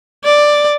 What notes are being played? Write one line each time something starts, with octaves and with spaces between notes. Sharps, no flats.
D5